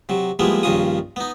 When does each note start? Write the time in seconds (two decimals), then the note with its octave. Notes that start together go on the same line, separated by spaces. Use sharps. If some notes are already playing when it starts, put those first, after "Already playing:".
0.09 C3 F#3
0.39 F3 G3 G#3 A#3 B3 E4
0.63 A#1 G2 D#3 C#4 F4 D#6
1.16 B3 D#4